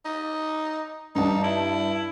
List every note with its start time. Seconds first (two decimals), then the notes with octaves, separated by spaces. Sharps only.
0.05 D#4
1.15 G2 D#4 A5
1.44 E4